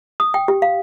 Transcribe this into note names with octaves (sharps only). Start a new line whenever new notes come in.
D#6
G5
G4
F5